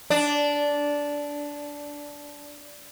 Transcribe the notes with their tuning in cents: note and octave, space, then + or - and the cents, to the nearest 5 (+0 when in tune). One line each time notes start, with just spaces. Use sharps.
D4 -10